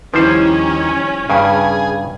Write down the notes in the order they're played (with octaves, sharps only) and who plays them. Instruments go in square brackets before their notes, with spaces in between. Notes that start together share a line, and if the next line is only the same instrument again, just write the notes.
[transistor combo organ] D#2 [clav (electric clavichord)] F3 G3 C5 [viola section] C#4 [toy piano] E4 B4
[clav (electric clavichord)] G2 C#3 [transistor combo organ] G#4